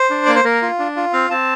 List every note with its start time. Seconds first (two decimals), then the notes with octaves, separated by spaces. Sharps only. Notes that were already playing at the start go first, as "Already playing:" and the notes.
Already playing: C5
0.10 D4
0.26 A#3 D5
0.35 C5
0.44 A#3 A#4
0.62 F4
0.79 D4
0.96 F4
1.13 C4 F5
1.30 C4 A5